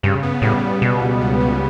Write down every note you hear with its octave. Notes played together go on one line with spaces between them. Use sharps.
G2 C#3
B3
A2 G3
C#3
B2 G3
C#2
C#3
B3